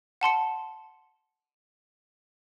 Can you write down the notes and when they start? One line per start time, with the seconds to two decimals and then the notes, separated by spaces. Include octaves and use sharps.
0.21 F#5 A5 C6 C#7